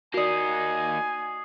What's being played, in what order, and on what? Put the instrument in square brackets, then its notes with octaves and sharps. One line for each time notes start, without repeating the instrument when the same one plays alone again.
[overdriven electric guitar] A#3 D#4 [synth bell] F#4 D5 [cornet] G#5 [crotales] D#6 C7